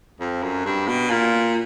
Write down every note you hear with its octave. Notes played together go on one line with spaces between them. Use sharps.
F2
F#2
G2
B2
A#2